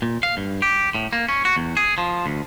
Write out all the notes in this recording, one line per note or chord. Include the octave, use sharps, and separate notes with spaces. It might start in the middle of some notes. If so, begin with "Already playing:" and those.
A#2
F5
G2
G4
A2
A#3
C#4
F#4
E2
G#4
F3
D2